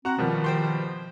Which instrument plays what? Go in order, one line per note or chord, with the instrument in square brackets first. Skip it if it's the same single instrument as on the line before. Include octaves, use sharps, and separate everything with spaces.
[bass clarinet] C4 [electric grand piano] F#4 [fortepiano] F#5 A#5
[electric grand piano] B2 F3 G3 [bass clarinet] D#3
[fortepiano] C5 G5 C6